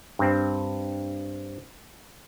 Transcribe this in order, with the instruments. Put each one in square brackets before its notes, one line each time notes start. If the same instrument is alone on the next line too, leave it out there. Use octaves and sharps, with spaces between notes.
[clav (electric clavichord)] G2 C4